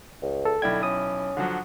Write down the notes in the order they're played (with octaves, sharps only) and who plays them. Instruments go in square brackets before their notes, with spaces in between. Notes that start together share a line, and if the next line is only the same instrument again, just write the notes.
[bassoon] C#2
[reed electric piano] A4
[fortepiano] B1 E4 G5 [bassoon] D3 [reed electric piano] G#6
[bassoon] C#4 [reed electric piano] D#6
[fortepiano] D3 F3 F#3